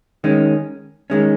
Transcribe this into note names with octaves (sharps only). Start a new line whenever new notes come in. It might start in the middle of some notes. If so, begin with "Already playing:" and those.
D#3 G#3 C#4
D#3 G#3 C#4